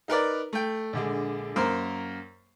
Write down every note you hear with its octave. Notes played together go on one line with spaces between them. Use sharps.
D#4 A#4 B4 D5
A3 G5
A#1 D3 G#3
F#2 A#3 A#4 C5